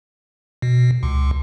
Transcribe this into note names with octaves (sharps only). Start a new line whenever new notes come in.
B2
C#2